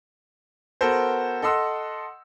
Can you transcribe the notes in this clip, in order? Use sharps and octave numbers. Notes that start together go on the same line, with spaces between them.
B3 F#4 A4 A#4 C5
A4 D#5 F#5 C6 E6